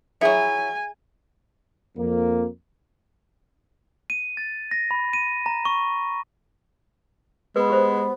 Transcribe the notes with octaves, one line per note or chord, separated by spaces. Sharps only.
F#3 E4 G#4 E5 G#5 C#7
F2 A#3
D#7
A6
A#6
B5
D#7
A#5
C#6
G#3 B3 B4
G4 C5